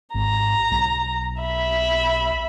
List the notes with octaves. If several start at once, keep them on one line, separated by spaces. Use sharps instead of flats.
G#1 A#5
B1
E5 B5